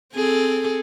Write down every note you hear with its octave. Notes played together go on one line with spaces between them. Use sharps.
C4 G#4 A4